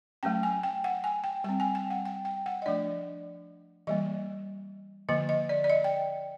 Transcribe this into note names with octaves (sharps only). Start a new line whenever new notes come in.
F#3 A3 C#4 G5
G#5
G5
F#5
G#5
G5
G3 C4 G5
G#5
G5
F#5
G5
G5
F#5
D#5
F3 A3 D4 D5
E3 G3 A#3 D#5
D3 F3 A#3 D#5
D#5
D5
D5
D#5
G5